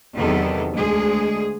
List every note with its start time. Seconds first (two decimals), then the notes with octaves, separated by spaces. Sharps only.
0.15 E2 C3 D#3 F#3 B3 A4
0.74 D2 G#3 G#4